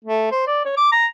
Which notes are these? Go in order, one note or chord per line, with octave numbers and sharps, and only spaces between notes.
A3
C5
D5
C#5
D6
A#5